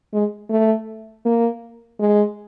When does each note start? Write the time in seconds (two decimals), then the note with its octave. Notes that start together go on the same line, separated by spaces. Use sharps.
0.13 G#3
0.50 A3
1.25 A#3
2.00 G#3